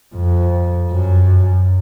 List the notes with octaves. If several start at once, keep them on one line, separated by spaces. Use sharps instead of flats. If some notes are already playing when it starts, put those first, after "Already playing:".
F2
F#2